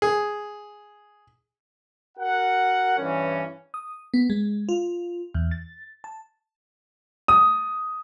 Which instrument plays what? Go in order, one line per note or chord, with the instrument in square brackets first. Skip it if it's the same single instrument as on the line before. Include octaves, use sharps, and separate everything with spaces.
[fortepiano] G#4
[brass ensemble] F#4 A#4 F#5
G2 E3 C#4
[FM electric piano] D#6
B3
G#3
F4
E2
A6
A5
[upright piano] D#6